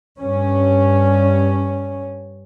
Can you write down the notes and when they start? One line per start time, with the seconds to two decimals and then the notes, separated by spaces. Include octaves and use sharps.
0.20 G2 C#4